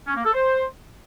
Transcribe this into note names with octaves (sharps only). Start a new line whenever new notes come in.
C#4
A#3
A4
C5